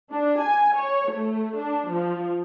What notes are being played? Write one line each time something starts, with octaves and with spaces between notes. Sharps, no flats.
D4
G#5
C#5
A3
D4
F3